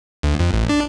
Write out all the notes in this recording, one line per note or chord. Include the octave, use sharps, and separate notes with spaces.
D2
F2
A1
D4